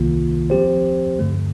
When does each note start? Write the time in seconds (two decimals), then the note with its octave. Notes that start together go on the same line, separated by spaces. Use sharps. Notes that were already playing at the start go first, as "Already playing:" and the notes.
Already playing: C2 C3 D#3 A#3 F4
0.50 F3 C4 G4 C5
1.19 G2 D3 A3